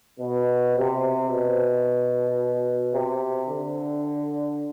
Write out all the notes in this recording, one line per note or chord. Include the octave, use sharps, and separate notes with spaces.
B2
C3
B2
C3
D3